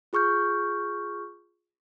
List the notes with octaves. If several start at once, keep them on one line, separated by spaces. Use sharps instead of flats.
F4 G#4 C#6 F6 G6